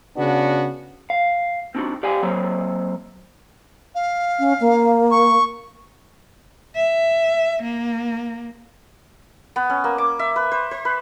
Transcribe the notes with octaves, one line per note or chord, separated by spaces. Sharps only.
C#3 B3 D4 F#4
F5
C4 D4 D#4 F#4
G4 D5 F5 G5 G#5
F#3 A#3 C4 A4 C5
F5
C#4
A#3
C#6
E5
A#3
B3
C#4
A#3
D6
E5
B4
C5
C5
B4